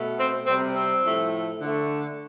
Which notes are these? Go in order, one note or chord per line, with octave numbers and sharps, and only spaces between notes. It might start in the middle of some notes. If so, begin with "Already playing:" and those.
Already playing: B2 A3
C4
C3 G3 C4
C4
A2 F3 A3
D3 A3